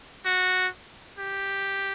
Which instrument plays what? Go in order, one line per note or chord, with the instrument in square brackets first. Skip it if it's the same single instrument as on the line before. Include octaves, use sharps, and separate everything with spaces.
[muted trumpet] F#4
G4